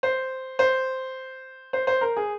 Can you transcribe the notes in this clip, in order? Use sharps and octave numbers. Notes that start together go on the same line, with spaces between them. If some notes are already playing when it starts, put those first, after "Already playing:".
C5
C5
C5
C5
A#4
G#4